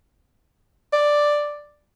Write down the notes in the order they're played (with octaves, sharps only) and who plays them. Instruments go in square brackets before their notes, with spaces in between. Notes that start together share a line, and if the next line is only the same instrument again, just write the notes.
[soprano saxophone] D5